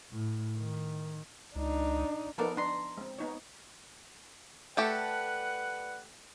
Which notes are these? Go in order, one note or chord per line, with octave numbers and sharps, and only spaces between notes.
A2
D#3
C#2 D4 D#4
F3 B3 D#4 A4 A#4 D5
D4 A#5 C6
G#3 C4
B3 D#4 C#5
A3 G4 A4 B4 D5 F#5